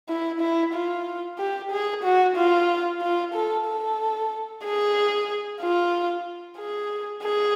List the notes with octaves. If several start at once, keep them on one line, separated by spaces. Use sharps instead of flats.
E4
E4
F4
G4
G#4
F#4
F4
F4
A4
A4
G#4
F4
G#4
G#4